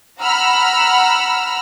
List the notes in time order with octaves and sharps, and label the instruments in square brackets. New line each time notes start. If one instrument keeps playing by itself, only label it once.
[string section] F#5 A#5 B5 E6 F6